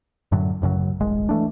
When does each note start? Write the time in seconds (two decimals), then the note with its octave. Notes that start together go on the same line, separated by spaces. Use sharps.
0.32 F#2 A2 D3 F#3
0.62 A1 F#2 C#3 F#3
1.00 D#1 G#1 G#3
1.29 E3 A3 D4